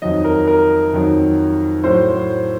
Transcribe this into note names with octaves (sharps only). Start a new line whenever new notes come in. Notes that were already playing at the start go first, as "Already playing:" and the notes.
F2 D#3 F#3 D#5
A#4
A#4
F2 D#3 F#3
A2 F#3 C5